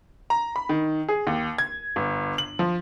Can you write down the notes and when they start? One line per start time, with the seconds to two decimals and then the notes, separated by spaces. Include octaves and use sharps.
0.30 A#5
0.56 B5
0.69 D#3
1.09 G#4
1.27 D#2
1.58 G#6
1.96 G1
2.38 F#7
2.59 F3